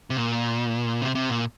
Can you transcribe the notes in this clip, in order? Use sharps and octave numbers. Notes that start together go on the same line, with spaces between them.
C3
A#2
C3
C3
A#2